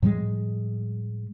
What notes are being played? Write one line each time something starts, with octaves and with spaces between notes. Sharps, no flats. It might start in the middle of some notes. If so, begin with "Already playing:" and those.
A2 F3 G3 G#3